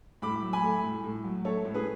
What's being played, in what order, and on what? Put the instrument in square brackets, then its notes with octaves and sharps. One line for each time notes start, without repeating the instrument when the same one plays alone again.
[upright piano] A2 B5 D6
F#3
G#5 B5
A3
A2
A2
F#3
A3 A4 C#5
A2
G#4 B4